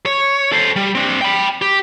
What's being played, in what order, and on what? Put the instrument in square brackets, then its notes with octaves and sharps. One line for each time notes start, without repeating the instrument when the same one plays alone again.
[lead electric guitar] C#5
A4 C5
G3
C4 D4
G5 B5
G4